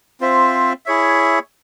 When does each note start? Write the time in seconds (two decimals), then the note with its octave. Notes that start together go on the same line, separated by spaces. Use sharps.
0.20 C4 F4 C5 E5
0.86 E4 G#4 C#5 E5